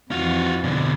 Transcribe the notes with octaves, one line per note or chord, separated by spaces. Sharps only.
F2 E3 F4 F#4
B2 D3